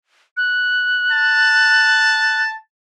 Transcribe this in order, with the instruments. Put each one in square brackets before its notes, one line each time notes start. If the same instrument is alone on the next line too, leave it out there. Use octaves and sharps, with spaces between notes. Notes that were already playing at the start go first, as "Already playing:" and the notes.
[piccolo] F#6
[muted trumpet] A5